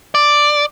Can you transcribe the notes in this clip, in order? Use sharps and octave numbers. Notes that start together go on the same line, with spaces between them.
D5